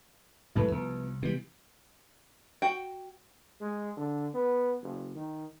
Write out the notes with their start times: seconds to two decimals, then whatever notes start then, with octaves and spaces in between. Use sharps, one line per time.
0.55 A1 G#2 F#3 E4 A4 B4
0.72 C2 F3 B3
1.22 C3 E3 G3 G#3 B3
2.62 F#4 F#5 G5
3.61 G#3
3.97 D3
4.34 B3
4.82 F#1
5.16 D#3